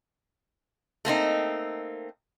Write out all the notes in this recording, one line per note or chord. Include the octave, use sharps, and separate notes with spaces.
A3 A#3 C4 D#4